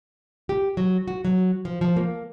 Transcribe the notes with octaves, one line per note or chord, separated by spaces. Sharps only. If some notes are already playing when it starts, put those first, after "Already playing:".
G4
F#3
F#4
F#3
F3
F3
A#3